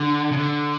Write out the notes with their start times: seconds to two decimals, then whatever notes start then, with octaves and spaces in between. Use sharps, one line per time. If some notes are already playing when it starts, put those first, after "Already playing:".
Already playing: D3
0.31 C#3
0.37 D3